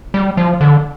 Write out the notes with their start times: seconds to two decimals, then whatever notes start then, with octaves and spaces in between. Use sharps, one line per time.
0.14 G3
0.37 F3
0.61 D3